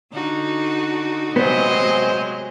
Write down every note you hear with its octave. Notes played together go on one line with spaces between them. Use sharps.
D3 D#4 F#4
C3 F#3 G#3 B3 C5 D#5